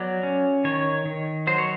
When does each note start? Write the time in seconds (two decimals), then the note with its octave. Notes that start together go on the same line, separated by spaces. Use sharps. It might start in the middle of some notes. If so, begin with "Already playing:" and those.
Already playing: F#3 B3 D5
0.23 C#4
0.64 D#3 C#5
1.06 D#3
1.47 F#3 C5
1.58 C#5